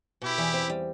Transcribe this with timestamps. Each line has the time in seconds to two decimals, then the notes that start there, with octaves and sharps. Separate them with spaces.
0.22 B2 E4 G4
0.38 E2
0.53 C4
0.69 G3